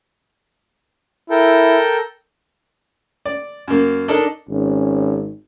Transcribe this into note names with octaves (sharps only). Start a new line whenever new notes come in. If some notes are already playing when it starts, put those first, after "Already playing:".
E4 A4 A#4 G5
D5
F#2 A#3
D4 D#4 A4 A#4 D5
G#1 C#4